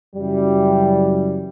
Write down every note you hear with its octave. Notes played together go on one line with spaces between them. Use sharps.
F#2 C#3 E3 G3